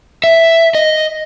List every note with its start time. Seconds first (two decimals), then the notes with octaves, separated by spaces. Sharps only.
0.24 E5
0.75 D#5